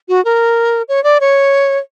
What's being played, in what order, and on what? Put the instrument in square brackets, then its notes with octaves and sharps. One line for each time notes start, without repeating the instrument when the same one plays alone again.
[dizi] F#4
A#4
C#5
D5
C#5